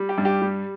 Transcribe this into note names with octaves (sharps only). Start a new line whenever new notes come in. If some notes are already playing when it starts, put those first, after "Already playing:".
Already playing: G3
G4
G2
G4
G3